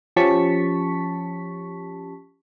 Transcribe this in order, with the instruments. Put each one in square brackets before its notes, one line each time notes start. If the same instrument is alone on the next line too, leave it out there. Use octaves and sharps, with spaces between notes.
[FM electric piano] F3 C#4 G4 A5 C#6 B6